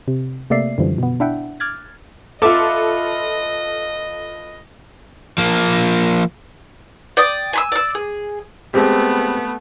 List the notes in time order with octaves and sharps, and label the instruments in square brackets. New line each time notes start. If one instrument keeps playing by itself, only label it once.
[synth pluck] C3
C3 A3 A#3 D5 E5 C7
F#2 D3 E3 F3 G3
B2 B3
D4 E4 E5 F#5 G5
D6 F6 F#6 G#6 A6
[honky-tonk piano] F4 A4 [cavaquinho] B4 E5 D6 [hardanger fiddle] D#5
[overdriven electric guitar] F3 A#3
[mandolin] D5 G5 D#6
G#5 B5 E6
D5 E6
G#4
[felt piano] G#3 C4 G4 [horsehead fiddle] A3 B3